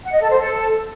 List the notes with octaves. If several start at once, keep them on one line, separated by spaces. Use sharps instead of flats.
F#5
D#5
A4
C5
A4